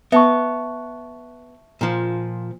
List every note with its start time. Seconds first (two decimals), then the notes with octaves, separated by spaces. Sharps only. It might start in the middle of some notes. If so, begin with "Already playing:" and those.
0.12 B3 E5 A5 C#6
1.81 A#2 F3